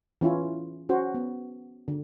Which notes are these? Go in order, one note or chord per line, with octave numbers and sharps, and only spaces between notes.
E3 C#4 E4 F4
C#4 F#4 C5
B3
D3